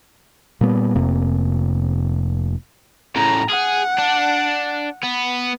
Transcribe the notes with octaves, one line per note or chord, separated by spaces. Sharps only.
A#2 G3 B3
F1 F2 C3 A#3
A2 C#3 A#5
G#4 F#5
D4
B3